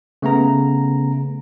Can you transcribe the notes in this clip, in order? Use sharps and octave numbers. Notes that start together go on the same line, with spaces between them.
C#3 A3 B3 A#5